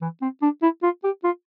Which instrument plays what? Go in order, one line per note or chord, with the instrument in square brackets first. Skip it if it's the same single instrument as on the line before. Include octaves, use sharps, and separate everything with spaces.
[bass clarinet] E3
C4
D4
E4
F4
G4
F4